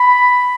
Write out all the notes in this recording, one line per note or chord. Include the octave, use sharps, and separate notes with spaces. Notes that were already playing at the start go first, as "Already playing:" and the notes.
Already playing: B5